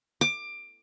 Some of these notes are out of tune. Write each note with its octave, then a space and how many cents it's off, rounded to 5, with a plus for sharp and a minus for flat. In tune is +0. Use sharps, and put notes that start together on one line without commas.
D6 +20